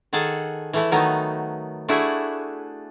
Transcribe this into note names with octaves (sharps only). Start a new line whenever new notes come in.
D#3 G#4 A4 F#5 A5
E3 A3 E4
D#3 F#3 A3 B3 D#4
A3 D4 E4 F#4 G#4